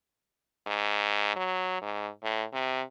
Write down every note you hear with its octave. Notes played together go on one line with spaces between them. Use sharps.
G#2
F#3
G#2
A2
C3